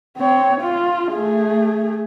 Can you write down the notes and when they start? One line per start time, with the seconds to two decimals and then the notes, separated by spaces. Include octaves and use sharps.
0.17 C4 C#5
0.61 F4
1.10 A3 G#4